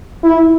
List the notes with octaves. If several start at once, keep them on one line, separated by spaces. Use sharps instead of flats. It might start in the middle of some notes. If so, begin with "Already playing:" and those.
E4